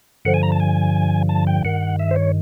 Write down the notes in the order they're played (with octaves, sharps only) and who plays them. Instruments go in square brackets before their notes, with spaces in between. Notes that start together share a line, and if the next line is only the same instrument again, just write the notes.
[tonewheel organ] G2 D3 F3 F#5
G#5
A#5
A5
G#5
A5
G5
G2 D#3 F#5
E5
C5
C#5